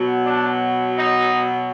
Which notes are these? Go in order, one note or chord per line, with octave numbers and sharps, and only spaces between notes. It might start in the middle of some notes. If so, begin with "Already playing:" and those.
Already playing: B2 F#3
D4
D#4